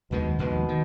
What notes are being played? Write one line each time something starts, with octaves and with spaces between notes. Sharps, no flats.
F1 D#2 B2 D#3 G#3
F1 D#2 B2 D#3 G#3
D#3